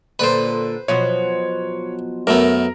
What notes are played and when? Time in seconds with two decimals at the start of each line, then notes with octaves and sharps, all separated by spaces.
0.19 A#2 D3 B4 C5
0.88 B2 F3 F#3 C#5
2.27 F#2 A3 B3 A#4